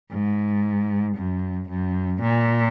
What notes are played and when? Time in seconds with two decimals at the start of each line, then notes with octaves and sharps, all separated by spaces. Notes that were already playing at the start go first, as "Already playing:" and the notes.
0.11 G#2
1.16 F#2
1.69 F#2
2.22 A#2